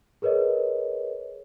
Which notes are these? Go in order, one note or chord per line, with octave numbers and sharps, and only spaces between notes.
G#4 A#4 B4 C#5 D#5